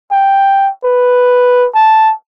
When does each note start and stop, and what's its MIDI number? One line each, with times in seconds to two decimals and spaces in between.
0.11 0.70 79
0.84 1.68 71
1.75 2.13 81